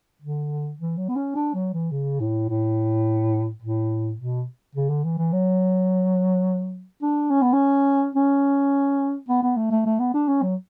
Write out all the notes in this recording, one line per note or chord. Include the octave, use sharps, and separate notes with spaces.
D3
E3
F#3
B3
C#4
D4
F#3
E3
C#3
A2
A2
A2
B2
C#3
D3
E3
E3
F#3
D4
C#4
B3
C#4
C#4
B3
B3
A3
A3
A3
B3
D4
C#4
F#3